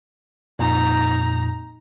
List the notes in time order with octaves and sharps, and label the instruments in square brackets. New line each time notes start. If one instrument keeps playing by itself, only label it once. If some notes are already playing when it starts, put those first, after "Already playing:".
[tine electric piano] F2 A#2 [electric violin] D#4 A#5